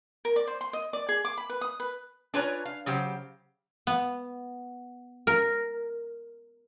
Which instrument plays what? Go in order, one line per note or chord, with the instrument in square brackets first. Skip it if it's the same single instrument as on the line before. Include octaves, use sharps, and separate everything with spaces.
[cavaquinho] A#4
D5
C5
C6
D#5
D5
G#4
D6
B5
B4
D#6
B4
[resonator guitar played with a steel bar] D4 F4 B4 C#5 G#5 A#5
F5
C#3 F#3 G4 C5
[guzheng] B3
A#4